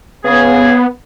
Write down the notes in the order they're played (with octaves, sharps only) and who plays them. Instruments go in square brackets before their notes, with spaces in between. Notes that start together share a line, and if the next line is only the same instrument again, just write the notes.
[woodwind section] C#3 G#4 [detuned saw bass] B3